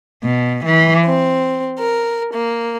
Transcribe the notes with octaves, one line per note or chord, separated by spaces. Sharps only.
B2
E3
C4
A#4
A#3